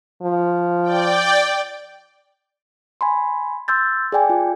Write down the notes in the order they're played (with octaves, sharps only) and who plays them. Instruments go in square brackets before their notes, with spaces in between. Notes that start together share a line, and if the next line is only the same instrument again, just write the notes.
[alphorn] F3
[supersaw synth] D5 G5
[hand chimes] G#5 B5 C6
C6 E6 G6 A6
G#4 D5 G5 G#5
F4